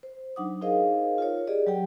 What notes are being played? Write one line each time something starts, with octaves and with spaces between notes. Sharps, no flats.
C5
F#3 D4 D#4 F#5 D6 D#6
D#4 G#4 A#4 C5 D#5 F5
F4 A#4 C#5
G4 G#4 D5 D#5
F#3 G4 G5